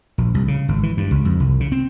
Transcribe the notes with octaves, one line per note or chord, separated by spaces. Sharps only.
A#1
C2
C#3
G#1
E3
G2
C#2
F2
C2
C#3
C4